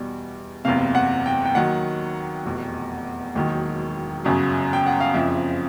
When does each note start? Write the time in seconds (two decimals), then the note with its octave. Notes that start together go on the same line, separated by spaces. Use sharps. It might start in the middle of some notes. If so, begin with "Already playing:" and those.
Already playing: E2 B2 G3
0.65 F#1 E2 C3 F5
0.95 F#5
1.26 G5
1.45 G5
1.55 D#2 D#3 F#3 F#5
2.45 F1 E2 B2
3.35 E1 D#2 D#3 F#3
4.24 G1 F#2 C#3 F#3
4.73 G5
4.87 F#5
5.00 F5
5.14 F#1 F2 C#3 F3 E5